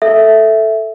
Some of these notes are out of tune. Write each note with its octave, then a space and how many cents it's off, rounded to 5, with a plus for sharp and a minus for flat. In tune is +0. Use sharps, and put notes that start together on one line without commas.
A4 +0 E5 +0